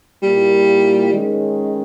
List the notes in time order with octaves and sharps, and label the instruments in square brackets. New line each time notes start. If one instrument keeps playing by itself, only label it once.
[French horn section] A#2 A#3 E4 [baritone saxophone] G3
[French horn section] D#3 G#3 C#4